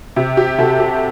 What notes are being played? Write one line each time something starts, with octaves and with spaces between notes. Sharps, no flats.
C3 G4
G4
C3 F#4 A4
G4